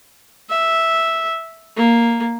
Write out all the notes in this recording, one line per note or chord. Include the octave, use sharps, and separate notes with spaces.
E5
A#3